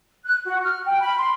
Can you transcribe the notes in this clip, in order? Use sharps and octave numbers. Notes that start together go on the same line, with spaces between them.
F#6
F#4
F6
G5
B5
C6